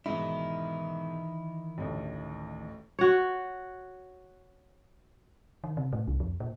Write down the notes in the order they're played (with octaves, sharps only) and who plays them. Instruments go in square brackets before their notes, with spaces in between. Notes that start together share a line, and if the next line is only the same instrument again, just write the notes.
[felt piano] G#2 B2 [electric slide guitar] D#3 D#4 [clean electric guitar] E3 E4
[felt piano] A1 D2 A3
[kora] F#4 C#5
[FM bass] D#3
C3
A2
C2
F2
A#2